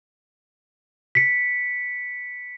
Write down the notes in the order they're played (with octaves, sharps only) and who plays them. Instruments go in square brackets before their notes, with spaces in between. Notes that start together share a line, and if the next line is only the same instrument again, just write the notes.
[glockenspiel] B6 C#7